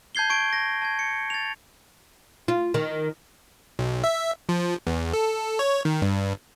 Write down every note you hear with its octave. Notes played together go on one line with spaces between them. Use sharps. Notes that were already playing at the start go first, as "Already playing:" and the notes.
A5 G6 G#6 C7 G7
A5 C#6 G#6 D7
A#6
A5 G#6
C#7
A6 F7
F4
D#3
B1
E5
F3
E2
A4
C#5
D#3
G2